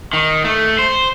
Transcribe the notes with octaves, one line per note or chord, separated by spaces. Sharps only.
D#3
A3
C5